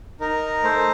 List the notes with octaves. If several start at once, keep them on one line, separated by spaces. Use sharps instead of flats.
D#4 A#4
A3 C5